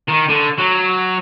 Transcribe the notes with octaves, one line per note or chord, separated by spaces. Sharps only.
D#3
D3
F#3